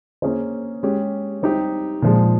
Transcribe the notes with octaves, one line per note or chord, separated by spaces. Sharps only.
A#3 C#4 G#4 C5
G#3 C#4 G4
G3 C4 D#4 G4
A#2 F3 G#3